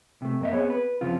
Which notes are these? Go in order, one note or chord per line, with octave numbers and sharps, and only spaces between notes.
C3 A3
F#2 A#3 D#5 E5
B3 C4 G#4 C#5
B4
F#2 C#3 F3 C4 F4